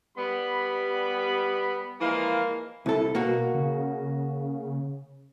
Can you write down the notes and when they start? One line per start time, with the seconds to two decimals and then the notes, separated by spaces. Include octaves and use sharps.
0.17 G3 B3 B5
2.01 E3 F3 G#3 A#3
2.86 C2 E4 A4
3.15 B2 A#3 F#4
3.54 C#3